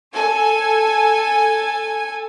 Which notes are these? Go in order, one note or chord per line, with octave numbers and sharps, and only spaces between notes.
A4 G#5